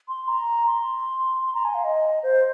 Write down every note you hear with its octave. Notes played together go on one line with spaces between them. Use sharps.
C6
A#5
C6
C6
A#5
G#5
F5
D#5
C5